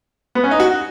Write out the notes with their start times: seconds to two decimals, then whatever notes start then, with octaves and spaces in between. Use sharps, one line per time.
0.35 B3
0.44 C#4
0.51 D#4
0.60 F#4